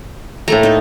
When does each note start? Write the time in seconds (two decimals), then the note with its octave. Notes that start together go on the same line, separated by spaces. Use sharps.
0.48 A2 A3 A#3 A4 A#5
0.63 D#4 C5